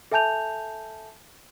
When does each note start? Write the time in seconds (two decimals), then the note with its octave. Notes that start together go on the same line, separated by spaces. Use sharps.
0.12 A4 E5 G#5 A5 G6 F7